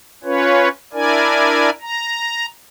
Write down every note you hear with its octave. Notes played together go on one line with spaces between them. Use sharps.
C#4 F4 B4 C#5
D4 E4 A#4 D5 G#5
A#5